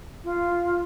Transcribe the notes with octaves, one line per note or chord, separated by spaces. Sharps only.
F4